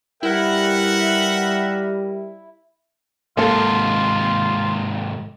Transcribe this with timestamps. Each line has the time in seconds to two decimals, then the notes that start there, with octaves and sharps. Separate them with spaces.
0.23 G3 E4 A#4 B4 E5 F#5
3.37 G#2 C3 A#3 F4 A4